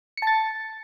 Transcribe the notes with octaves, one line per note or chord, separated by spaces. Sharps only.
A5 A6 C#7